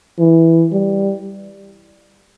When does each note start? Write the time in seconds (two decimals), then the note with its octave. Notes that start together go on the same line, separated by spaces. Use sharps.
0.19 E3
0.72 G3